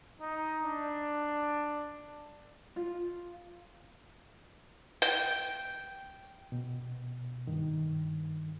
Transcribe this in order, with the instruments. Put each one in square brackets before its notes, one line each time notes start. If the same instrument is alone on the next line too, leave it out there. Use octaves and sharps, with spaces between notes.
[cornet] D#4
D4
[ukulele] F4
[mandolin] G5
[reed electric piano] B2
G2 D#3